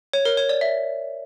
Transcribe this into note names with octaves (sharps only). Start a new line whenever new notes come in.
C#5
A#4
C#5
D5
E5